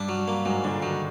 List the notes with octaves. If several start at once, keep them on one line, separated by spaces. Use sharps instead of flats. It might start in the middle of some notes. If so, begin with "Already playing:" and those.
Already playing: G2 G3 D4
F#3
A#3
G#2 F#3 G#3
A#2 D3 D4
D#3 F#3 D#4